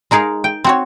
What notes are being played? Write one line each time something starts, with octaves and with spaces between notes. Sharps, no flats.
G#3 D#4 G#4 A#4 F5
G5
C4 F#4 C#5